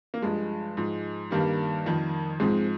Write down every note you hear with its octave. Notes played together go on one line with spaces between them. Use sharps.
A#3
G2 F3 G#3
G#2 F3
G2 D#3 G3 A#3
F2 D#3
G#2 F3 G#3 C4